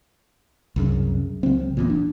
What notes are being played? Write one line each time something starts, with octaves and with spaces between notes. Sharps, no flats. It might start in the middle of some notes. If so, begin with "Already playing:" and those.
C2 F#2 C#3
C#2 C#3 F#3 C4
E1 E2 A#2
D4